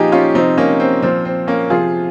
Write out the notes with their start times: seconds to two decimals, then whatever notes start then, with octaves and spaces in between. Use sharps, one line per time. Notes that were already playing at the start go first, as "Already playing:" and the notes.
Already playing: A#2 F3 D#4 F4 G4 G#4
0.12 C#4 F4
0.35 C3 F3 C4 D#4
0.58 A#3 C#4
0.80 C4
1.02 A#2 F3 C4
1.25 C4
1.47 A#3 C#4
1.70 C3 F3 F4 G#4